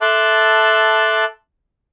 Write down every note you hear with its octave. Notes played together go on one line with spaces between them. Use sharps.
A4 E5 A5 C6 D6 F#6